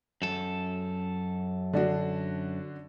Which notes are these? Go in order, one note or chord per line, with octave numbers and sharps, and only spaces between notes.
F#2 A4
D3 D4 F#4